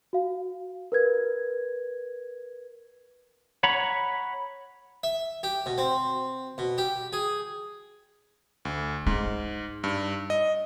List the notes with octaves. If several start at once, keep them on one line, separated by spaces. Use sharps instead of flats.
F#4 F5
A#4 B4 G#6
C#5 F#5 A#5 B5
E5
G4
B2
C4
B2
G4
G#4
D2
G#2 D#4
G2
D#5